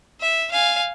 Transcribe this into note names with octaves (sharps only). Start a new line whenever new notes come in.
E5
F5 G#5